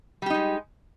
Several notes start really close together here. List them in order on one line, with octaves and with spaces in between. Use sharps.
G3 G4 D#4 G#3